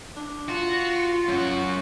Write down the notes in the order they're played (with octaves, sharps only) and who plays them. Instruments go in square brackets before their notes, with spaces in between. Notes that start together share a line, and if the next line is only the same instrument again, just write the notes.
[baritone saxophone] D4
[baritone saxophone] F4 [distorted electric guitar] F#4
[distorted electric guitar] F#2 F#4